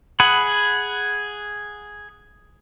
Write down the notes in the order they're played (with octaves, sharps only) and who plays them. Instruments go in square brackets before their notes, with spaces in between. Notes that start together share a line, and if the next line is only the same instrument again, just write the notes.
[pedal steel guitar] G#4 F#5 B5